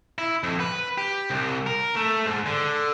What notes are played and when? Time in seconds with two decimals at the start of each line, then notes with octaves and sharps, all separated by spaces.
0.18 E4
0.44 F2
0.60 B4
0.98 G4
1.30 C2
1.67 A#4
1.96 A3
2.26 G#2
2.46 D3